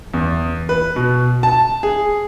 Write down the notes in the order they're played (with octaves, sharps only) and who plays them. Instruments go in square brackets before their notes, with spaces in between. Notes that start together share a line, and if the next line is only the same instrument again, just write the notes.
[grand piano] E2
B4
B2
A5
G#4